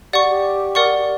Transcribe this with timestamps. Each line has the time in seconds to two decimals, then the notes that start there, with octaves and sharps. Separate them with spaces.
0.13 G4 D5 F#5 C#6
0.29 G4
0.75 A#4 D5 F#5 C#6
0.98 G4